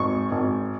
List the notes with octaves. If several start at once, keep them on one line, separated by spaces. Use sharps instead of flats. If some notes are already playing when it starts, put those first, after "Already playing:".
Already playing: G#1 C#6
G#1